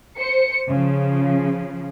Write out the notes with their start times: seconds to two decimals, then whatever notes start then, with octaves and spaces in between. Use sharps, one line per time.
0.19 C5 C#7
0.68 C#3 F3